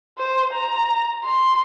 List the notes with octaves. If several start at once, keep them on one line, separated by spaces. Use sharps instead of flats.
C5
A#5
C6